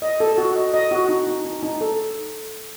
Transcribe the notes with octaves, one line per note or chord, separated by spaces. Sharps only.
D#5
A4
F#4
D#5
D#5
F#4
D#4
D#4
D#4
D#4
A4